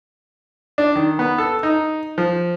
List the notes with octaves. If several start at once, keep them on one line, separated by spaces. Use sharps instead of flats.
D4
D#3
B3
A4
D#4
F3